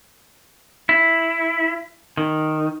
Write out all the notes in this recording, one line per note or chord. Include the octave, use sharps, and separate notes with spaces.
E4
D#3